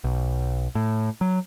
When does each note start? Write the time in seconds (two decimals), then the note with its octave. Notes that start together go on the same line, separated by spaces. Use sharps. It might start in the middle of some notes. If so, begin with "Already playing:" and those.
0.04 B1
0.75 A2
1.21 F#3